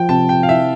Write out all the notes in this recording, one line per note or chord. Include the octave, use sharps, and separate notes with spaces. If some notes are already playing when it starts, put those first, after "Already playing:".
Already playing: F3 G5
C3 A5
G5
F5
E4 E5